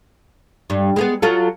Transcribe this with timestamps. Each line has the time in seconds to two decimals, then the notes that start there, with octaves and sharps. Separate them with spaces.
0.70 G2
0.96 G#3 A#3 B3
1.22 F#3 F4 A4